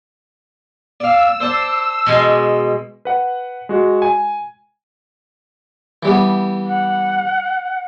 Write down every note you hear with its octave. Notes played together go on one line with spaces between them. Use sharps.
D5 F5 E6
C5 D5 A5
B2 G#3 G#5
B4 F#5
G#3 F#4
G#5
E3 G3 B3
F#5